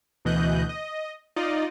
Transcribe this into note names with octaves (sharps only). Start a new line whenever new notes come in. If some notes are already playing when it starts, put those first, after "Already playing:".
D2 B2 E3 D#5 F#6 G6
D#5
D#4 F4 D5 D#5